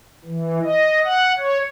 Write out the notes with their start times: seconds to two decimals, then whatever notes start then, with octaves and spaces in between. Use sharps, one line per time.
0.25 E3
0.62 D#5
1.01 F#5
1.38 C#5